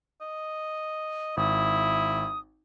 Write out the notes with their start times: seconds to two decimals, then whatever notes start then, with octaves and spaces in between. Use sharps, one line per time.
0.21 D#5
1.37 G#1 E4 D#6